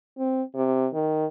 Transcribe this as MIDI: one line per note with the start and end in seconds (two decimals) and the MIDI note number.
0.18 0.43 60
0.55 0.87 48
0.93 1.26 51